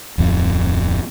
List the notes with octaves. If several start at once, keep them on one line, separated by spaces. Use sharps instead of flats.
D1 F2 F3